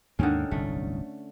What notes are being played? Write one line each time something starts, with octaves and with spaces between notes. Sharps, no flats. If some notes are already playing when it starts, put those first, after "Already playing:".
D#2 G#2 D3 D#3 A#3 C#4
D1 G1 C2 A3